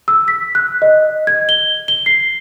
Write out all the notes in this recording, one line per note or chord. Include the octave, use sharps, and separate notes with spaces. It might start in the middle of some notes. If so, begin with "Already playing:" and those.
E6
B6
F#6
D#5
G#6
G7
G7
C7